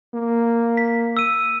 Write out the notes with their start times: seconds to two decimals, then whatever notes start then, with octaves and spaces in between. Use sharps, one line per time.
0.14 A#3
0.77 B6
1.17 E6 D#7